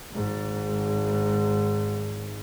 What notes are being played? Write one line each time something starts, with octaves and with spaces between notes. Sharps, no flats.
G#1 G#2